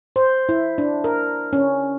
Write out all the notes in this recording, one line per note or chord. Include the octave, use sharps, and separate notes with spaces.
C5
E4
D4
A#4
C#4